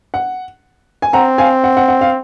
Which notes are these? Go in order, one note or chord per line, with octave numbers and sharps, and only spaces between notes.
F#5
G#5
C4 F#5 A#5
F5 G#5
F#5
F#5
F#5
F5